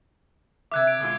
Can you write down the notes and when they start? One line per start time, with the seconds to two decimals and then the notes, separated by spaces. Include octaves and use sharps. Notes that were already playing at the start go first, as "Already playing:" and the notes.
0.72 C3 G3 E5 D6 F#6 G#6
0.87 D7
1.00 B2 G#3 F4